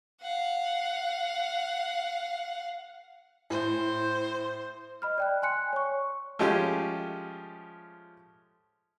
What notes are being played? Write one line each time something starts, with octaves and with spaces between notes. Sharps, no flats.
F5 F#5
A2 C5
D#5 B5 F6
D5 G5 F#6
G#5 C6 F#6 C#7
C#5 C#6
F3 G#3 A3 C#4 G4